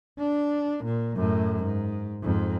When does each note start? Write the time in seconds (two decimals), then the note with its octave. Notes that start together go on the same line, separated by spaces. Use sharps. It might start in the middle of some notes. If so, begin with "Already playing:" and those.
0.19 D4
0.84 A#2
1.16 F#2 A2
1.63 G#2
2.23 F2 G#2